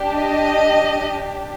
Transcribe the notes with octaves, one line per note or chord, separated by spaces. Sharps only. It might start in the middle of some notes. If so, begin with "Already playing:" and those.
Already playing: D4 G4
D#5